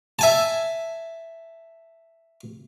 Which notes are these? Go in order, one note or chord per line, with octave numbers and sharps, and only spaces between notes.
E5 G#5 A5